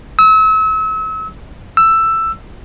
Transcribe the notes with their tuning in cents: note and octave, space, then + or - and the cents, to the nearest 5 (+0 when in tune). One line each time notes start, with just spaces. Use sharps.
E6 -35
E6 +10